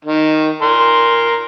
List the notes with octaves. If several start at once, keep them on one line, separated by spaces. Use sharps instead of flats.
D#3
A#4 C6